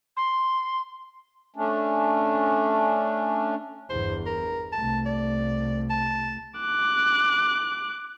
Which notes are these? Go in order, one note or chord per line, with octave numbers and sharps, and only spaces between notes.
C6
A3 C#4 D4
G1 E2 C5
A#4
C2 A3 A5
D5
A5
D6 F#6